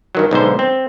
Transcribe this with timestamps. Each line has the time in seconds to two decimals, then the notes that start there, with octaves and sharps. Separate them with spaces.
0.15 G2 D#3 F#3
0.31 B1 G#2 D3 C5
0.59 C4